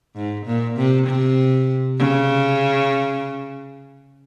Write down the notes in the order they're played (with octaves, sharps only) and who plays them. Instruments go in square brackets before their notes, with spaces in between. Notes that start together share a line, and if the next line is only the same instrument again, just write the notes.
[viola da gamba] G#2
A#2
C3
C3
C#3